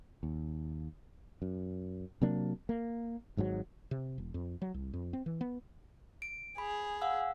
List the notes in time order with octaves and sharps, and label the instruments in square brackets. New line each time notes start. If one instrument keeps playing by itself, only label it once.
[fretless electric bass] D#2
F#2
C3 F#3 A#3 D4
A#3
G#1 G#2 B2 F#3
C3
E1
F2
F#3
C2
F2
C4
E3
B3
[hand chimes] D7
[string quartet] G#4 [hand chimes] B5
[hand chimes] F5 F#5 E6